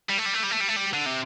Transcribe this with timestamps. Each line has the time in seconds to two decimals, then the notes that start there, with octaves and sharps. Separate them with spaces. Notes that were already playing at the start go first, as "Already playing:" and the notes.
0.10 G3
0.18 A3
0.26 G3
0.34 A3
0.44 G3
0.51 A3
0.61 G3
0.68 A3
0.76 G3
0.93 D3
1.06 C3